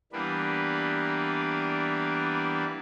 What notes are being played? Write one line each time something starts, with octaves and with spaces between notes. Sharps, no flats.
E3 G3 A#3 B3 D4 B4